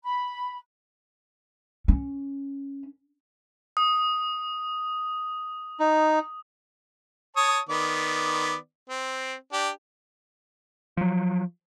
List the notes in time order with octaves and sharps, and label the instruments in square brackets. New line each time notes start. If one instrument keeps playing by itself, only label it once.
[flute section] B5
[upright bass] C#4
[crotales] D#6
[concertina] D#4
[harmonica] C#5 A5 D#6
D#3 B3 D5
C4
D4 G4
[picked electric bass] F3 F#3